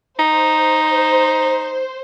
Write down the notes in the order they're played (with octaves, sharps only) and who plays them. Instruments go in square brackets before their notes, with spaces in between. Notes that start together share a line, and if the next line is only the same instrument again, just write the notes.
[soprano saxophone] D#4 [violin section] C5